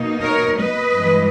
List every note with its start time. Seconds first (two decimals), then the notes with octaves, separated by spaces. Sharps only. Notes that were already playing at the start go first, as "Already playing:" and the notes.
Already playing: B2 A#3 D#4
0.24 A#4 C#5
0.59 B4 D#5
0.94 G2 E3 G#3